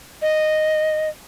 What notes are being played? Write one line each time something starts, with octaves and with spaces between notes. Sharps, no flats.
D#5